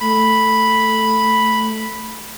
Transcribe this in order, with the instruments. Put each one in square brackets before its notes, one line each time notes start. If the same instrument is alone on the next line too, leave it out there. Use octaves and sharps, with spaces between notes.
[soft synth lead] A3 [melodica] B5